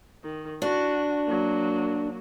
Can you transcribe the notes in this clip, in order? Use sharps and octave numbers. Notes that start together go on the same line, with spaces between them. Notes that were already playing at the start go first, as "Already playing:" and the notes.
D#3
D4 F#4
F#3 A#3